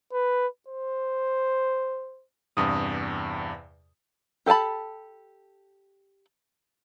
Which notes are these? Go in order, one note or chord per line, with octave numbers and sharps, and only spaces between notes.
B4
C5
E2 G2 C3 D#6
G4 A4 G#5 A5 B5